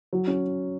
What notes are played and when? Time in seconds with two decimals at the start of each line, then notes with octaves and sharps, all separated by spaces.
0.13 F#3
0.27 C#4